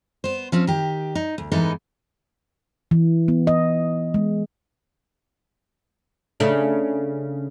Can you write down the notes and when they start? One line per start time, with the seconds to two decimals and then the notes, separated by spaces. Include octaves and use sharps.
0.24 B3 C5
0.52 F3 C4 C#4
0.67 D#3 G4
1.15 D#4
1.38 D2
1.52 G#2 E3 B3 D#4 A4 A#4
2.91 E3
3.28 B3
3.47 D#5
4.14 G#3
6.40 C#3 A3 D4